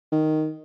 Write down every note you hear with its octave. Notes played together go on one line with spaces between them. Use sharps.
D#3